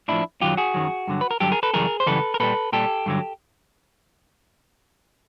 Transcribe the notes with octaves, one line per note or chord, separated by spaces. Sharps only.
A2 F3 D4 E4
F#2 D#3 F#3 F4 G4
F#4 G#4
F#2 D#3 F#3
G2 D3 F#3
B4
A#4
G2 D3 F#3 G4 A4
G#4 A#4
A4 B4
F#2 C#3 E3 G3 G#4 A#4
C5
F#2 C#3 E3 G3 A4 B4
A#4
A#2 G3 A4 B4
A#2 G3 G4 A4
G2 D3 F#3